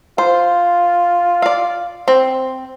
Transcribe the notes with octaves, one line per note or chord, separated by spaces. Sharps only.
F4 C5
D5 F5
C4